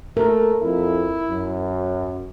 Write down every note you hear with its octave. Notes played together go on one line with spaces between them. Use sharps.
A3 A#4
F2 E4
F#2